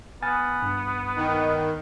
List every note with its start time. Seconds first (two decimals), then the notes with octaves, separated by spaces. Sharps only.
0.22 B3 G#5 F6 A6
0.62 G2
1.16 D#3